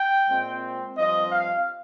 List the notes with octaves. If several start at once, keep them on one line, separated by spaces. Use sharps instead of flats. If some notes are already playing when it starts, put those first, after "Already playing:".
Already playing: G5
A#2 G#3 C4
G2 F3 C4 D#5
F5